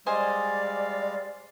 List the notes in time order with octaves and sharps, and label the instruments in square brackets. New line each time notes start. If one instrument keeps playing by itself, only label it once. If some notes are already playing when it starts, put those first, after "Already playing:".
[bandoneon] G3 G#3 F5 [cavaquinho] C5 D#5 G#5 [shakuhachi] D5